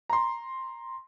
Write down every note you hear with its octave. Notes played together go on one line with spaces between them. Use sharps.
A#5 C6